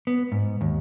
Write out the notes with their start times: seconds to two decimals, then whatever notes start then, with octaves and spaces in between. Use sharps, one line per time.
0.07 B3
0.32 G#2
0.61 D#2